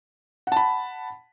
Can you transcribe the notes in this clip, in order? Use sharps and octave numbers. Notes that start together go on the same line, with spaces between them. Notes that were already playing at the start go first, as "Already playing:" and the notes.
F#5 A5 B5